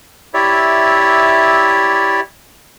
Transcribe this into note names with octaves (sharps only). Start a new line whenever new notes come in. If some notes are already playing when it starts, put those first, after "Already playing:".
E4 G4 C#5 D5 E5